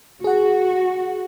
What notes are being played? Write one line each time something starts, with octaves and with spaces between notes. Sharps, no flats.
F#4 G#4 F#5